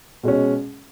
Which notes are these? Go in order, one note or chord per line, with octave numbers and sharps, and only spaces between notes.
B2 G#3 C#4